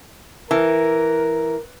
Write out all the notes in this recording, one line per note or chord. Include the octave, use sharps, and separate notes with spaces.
E3 A#4